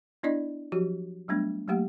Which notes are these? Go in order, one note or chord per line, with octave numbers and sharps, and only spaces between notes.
B3 D4 E4 D5 D#5
F3 F#3 F#4 G4
F#3 G3 A3 B3 D4
F#3 A3 A#3 G4 F#5